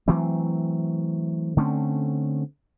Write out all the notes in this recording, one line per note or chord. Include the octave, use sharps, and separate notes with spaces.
E3 F#3 A3 C4
D3 A3 C4 C#4